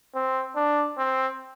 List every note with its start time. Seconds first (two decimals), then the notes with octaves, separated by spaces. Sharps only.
0.15 C4
0.56 D4
0.98 C4